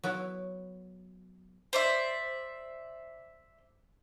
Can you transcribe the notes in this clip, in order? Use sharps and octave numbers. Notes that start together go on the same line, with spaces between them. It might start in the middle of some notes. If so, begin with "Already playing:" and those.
F#3 B3 E4
C5 D5 E5